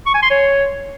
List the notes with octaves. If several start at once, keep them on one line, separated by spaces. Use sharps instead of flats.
C#6
G#5
C6
C#5